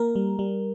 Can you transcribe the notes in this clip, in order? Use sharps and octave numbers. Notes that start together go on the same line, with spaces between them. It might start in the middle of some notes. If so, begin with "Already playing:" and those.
Already playing: A#3 A#4
G3
G3